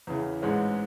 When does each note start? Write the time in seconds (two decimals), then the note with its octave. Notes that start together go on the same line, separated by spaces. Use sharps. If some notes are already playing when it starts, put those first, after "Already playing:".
0.07 E2 C#3 E3
0.42 A1 G#2 G#3 C#4